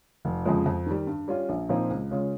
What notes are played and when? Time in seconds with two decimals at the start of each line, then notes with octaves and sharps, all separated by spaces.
0.25 F1
0.45 F2 C#3 F3 G#3
0.66 F2
0.86 D#3 G3
1.07 G2
1.28 G3 C#4 F4
1.49 A#1
1.69 A#2 F3 C4 D#4
1.90 C#2
2.11 C#3 G#3 C#4 F4